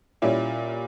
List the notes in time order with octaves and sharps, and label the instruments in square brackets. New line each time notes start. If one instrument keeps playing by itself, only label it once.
[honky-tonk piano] A#2 G3 C#4 E4